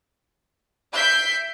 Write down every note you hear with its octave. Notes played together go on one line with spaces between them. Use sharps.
E5 G6 B6 C7 D7